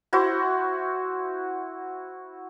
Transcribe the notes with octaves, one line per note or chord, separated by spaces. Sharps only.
E4 F#4 C5